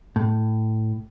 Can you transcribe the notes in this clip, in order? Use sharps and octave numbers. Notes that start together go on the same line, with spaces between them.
A2